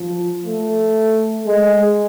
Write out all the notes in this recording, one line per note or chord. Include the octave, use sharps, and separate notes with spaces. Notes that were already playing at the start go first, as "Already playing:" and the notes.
Already playing: F3
A3
G#3